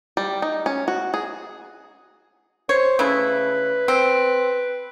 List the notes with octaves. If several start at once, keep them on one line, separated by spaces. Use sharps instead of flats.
G3
D#4
C#4
F#4
G#4
C5 C#5
C#3 A3 E4 B4
C4